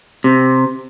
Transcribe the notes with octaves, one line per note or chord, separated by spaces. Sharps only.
C3